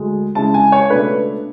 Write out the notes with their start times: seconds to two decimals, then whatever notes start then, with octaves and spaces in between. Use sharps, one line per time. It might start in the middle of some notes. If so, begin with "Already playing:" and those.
Already playing: D2 G#3
0.35 C#3 G#3 C#4 E4 A5
0.54 G#5
0.72 C#5
0.90 C#2 B2 A3 D4 B4